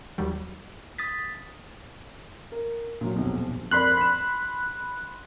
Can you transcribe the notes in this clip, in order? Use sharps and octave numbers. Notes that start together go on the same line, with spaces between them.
D#2 F#3 G3
D#6 A6 B6
A#4
A#2 F#3
D#1 B1 F2
F2 A#4 D5 B5 C6 F#6
B6 E7